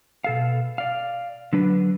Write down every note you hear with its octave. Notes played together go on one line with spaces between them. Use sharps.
B2 A4 F5
D5 F5
D3 F#3 D4 B4